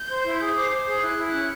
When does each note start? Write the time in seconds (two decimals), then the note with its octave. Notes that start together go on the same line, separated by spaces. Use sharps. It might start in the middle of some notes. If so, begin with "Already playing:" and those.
Already playing: G6
0.09 C5
0.25 E4
0.40 G#4
0.56 C5 D6
0.71 C5
0.87 G#4 G6
1.02 E4 F#6
1.18 E4
1.25 F#6
1.32 C#4